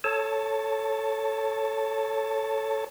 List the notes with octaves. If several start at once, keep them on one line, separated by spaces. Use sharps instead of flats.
A4 C#5 A5